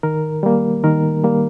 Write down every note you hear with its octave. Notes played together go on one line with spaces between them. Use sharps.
D#3 A#4
G3 A#3
D#3 A#4
G3 A#3